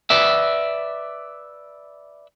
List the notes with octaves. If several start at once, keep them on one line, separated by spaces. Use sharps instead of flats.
B4 D5 E5